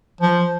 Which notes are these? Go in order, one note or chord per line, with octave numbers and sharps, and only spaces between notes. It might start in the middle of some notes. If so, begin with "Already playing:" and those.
F3